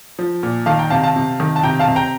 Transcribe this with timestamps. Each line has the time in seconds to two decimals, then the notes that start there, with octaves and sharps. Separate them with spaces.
0.19 F3
0.43 A#2
0.66 D#3 F5 A5
0.79 G5 A#5
0.90 C3 F5 A5
1.04 F5 A5
1.16 C3
1.40 D#3
1.56 A5
1.63 C3 G5 A#5
1.79 F5 A5
1.87 C3
1.96 G5 A#5